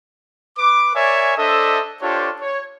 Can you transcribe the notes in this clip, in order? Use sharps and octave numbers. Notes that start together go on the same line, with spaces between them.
B4 D6
A#4 C#5 D5 E5 G#5
D4 A4 C5 D#5 E5
D4 F4 G4 A4 C5 C#5
C#5